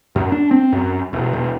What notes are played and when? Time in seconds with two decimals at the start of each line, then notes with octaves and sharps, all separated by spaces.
0.16 F#2
0.32 D4
0.51 C4
0.73 F#2
1.13 E1
1.33 E1